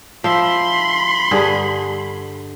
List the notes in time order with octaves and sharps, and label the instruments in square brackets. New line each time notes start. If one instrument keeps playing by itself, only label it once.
[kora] F3 E5 [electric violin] B5 C6
[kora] G2 D3 G#4